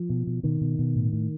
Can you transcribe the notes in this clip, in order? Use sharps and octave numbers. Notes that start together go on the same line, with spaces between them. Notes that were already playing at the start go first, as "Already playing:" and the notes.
Already playing: F3
B2
B2
B2 D#3
B2
B2
A2
A2